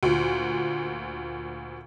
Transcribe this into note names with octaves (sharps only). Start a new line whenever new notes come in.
D2 A#2